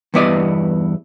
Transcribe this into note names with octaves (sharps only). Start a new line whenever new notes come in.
E2 G2 B3 E4 D5 D#5